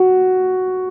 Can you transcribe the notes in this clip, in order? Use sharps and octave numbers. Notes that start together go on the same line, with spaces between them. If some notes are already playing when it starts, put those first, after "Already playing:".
Already playing: F#4